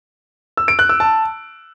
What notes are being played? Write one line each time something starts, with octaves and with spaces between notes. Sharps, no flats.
E6
D7
F#6
E6
A5